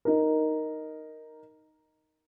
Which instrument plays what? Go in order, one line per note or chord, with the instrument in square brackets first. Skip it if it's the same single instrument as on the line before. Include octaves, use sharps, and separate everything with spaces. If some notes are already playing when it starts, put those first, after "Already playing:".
[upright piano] D#4 A#4